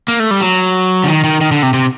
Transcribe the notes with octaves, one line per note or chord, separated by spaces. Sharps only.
A#3
A3
G3
F#3
D3
D#3
D#3
D#3
D3
C3
C3